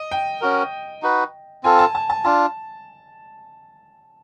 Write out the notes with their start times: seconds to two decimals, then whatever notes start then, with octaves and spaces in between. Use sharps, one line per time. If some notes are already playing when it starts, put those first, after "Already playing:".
Already playing: D#5
0.11 G5
0.41 C#4 F#4 A#4
1.02 D#4 F#4 B4
1.64 C4 F4 A4 G#5
1.79 A5
1.95 A5
2.10 A5
2.25 D4 F4 A5